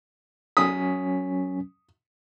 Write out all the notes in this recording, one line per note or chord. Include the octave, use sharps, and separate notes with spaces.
F#3 C#4 D#6 B6